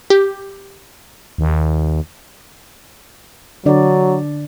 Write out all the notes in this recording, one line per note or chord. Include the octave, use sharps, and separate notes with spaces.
G4
D#2
D3 F#3 D4 D5